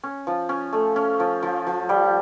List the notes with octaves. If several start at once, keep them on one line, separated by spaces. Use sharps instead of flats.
C#4
F3
C#4
A3
C#4
F3
F3
F3
G3